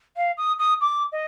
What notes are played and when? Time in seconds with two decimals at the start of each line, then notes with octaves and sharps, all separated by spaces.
0.16 F5
0.37 D#6
0.59 D#6
0.81 D6
1.12 D#5